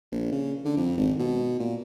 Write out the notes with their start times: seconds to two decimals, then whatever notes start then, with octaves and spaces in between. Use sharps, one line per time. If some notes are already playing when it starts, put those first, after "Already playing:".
0.12 A#1
0.32 C#3
0.65 D3
0.77 F2
0.97 G#1
1.19 B2
1.59 A#2